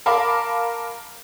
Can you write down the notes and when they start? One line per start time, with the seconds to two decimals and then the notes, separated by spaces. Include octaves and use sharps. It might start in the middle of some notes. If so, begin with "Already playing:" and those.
0.06 A#4 F5 A5 B5 D6